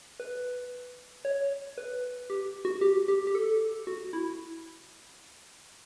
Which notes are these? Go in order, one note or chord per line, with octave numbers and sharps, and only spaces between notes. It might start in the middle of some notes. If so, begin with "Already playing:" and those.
B4
C#5
B4
G4
F#4
G4
G4
G4
A4
F#4
E4